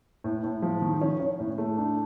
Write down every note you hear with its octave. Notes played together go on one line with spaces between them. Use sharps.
A2
A2
F3
D#3
C#4
C#4
A2
A3
D4